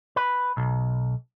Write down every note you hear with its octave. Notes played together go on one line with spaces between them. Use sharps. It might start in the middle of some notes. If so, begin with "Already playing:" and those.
B4
B1